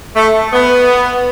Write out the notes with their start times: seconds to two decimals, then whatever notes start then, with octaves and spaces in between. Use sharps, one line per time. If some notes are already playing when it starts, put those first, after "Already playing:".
0.16 A3
0.53 B3